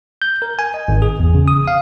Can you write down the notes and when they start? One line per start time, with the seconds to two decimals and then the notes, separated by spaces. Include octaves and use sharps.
0.22 G6
0.42 A#4
0.59 G#5
0.74 D#5
0.88 G#1
1.02 G#4
1.20 E2
1.35 C#3
1.48 D#6
1.68 F5